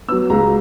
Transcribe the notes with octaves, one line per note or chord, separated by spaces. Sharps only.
F#3 B3 E6
C#2 A#5